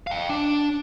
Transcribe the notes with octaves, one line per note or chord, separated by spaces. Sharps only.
F5 G5
D4